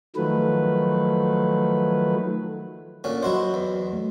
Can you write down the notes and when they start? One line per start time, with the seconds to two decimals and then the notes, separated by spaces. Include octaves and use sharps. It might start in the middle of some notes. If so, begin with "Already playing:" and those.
0.16 D#3 F3 F#3 A3 B4
3.04 A#2 D3 C#4
3.23 F#3 E4 F#4 C5 D#5
3.54 E2
3.93 A3